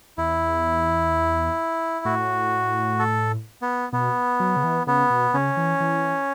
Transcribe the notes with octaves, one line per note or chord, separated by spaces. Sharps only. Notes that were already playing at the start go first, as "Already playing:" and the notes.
E2 E4
A2 F#4
A4
B3
B2 B3
F#3
C#3
E3
C#3 B3
B2
C#3 C#4
E3
E3